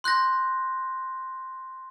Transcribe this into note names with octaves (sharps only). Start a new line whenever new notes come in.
C6 F#6 G6 A#6